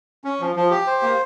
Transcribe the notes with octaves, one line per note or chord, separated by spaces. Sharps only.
C#4
F3
F3
G4
C5
A#3